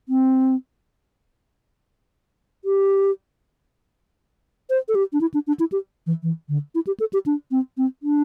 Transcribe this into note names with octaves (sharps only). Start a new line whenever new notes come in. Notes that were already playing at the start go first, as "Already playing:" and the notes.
C4
G4
C5
A4
G4
D4
E4
D4
D4
E4
G4
E3
E3
D3
E4
G4
A4
G4
D4
C4
C4
D4